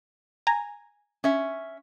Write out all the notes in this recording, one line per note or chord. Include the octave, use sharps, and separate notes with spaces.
G#5 A#5
C#4 E5